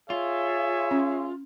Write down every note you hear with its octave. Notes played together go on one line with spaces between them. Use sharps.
F4 G#4 C#5 E5
C#4